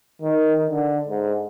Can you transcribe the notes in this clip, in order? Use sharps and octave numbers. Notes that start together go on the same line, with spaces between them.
D#3
D3
G#2